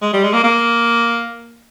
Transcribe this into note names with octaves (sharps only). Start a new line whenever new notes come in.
G#3
G3
G#3
A#3
A#3